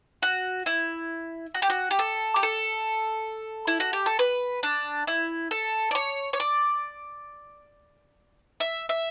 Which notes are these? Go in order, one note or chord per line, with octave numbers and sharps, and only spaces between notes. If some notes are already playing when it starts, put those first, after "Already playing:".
F#4
E4
F#4
G4
F#4
G4
A4
G4
A4
E4
F#4
G4
A4
B4
D4
E4
A4
D5
C#5
C#5
D5
E5
E5